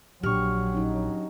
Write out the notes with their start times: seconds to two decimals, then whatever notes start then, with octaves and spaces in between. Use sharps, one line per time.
0.23 A#1 F#3 D4 G4 C#6 F6
0.74 C#4 D#4